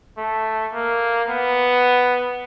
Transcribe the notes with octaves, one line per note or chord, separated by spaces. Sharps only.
A3
A#3
B3